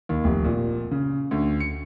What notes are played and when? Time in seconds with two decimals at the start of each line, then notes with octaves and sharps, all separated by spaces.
0.09 D#2
0.24 F1
0.44 A#2
0.91 C#3
1.31 D2
1.60 C#7